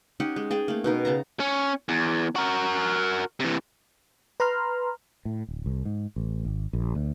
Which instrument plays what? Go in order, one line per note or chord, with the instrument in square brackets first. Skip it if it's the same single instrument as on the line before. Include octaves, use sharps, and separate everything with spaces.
[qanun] C#4 D#4 G4 F#5
G#3
G#4 G5 A5
A3 A#3
B2 D#4 A#4
C#3 A5 A#5
[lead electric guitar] C#4
E2
F#4 A#4
C3 E3
[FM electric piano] B4 A#5 C6 F6
[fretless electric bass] A2
D1
C2
G#2
A1
G#1
A#1
D2